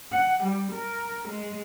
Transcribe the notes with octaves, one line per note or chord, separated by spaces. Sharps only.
F#5
G3
A#4
G#3